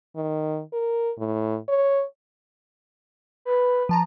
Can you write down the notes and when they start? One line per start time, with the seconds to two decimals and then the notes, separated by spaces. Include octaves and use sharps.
0.16 D#3
0.73 A#4
1.18 A2
1.68 C#5
3.45 B4
3.89 F3 A5 A#5